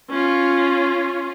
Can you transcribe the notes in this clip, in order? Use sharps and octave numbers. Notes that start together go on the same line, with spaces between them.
C#4 F4